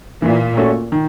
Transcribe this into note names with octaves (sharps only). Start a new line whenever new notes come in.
A#2 E3
A3 C#4 F#4 A4
D#3